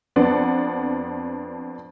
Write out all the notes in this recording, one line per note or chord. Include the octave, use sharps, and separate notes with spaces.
F2 B3 D4